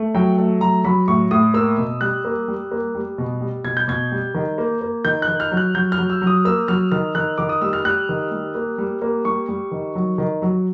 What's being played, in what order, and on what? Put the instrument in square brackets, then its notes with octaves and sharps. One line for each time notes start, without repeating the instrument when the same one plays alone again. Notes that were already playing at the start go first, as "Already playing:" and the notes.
Already playing: [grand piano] A3
F#3 G5
A3
F#3 A#5
F#3 B5
A2 C#6
A2 D#6
A#3 E6
B2
G3 F#6
A#3
G3
A#3
G3
B2
G3
B2 G#6
G6
B2 G#6
G3
D#3
A#3
A#3
D#3 G6
F#6
D#3
F6
F#3
F#6
F#3 G6
F6
F#3
E6
F#3
D#6
A#3 E6
F#3 F6
D#3 F6
D#3 F#6
D#3 D6
D#6
G3 E6
F6
G3 F#6
D#3
G3
A#3
G3
A#3
G3 C#6
G3
D#3
F#3
D#3
F#3